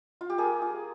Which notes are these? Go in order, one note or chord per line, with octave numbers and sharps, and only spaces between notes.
F4
G4
A#3 G#4
F4